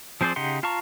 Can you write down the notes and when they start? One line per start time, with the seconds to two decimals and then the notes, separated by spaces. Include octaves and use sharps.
0.21 F3 C4 G#4 C5 D5
0.36 C#3 D#4 G4 F#5 C6
0.63 F4 F5 A5 A#5 C#6